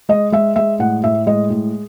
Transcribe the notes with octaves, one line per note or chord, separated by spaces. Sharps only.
G#3 D#5
G#3 E5
G#3 E5
A2 F#5
A2 E5
G#3 D#5
A2